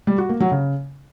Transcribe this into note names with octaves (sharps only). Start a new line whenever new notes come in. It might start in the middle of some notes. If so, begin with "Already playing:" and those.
G3
F#4
A#3
F#3
C#3